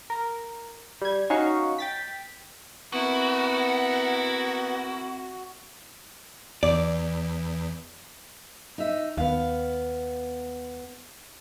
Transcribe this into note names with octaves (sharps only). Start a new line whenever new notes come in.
A#4
G3 G#6
C#4 D#4 F#4 C#5 F5 C#6
G5 A6 B6
B3 C4 E4 F#4 A#4
E2 D5
D#4 E5
D#2 B3 F5